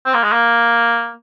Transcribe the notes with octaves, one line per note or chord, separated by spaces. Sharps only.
C4
A#3
G#3
A#3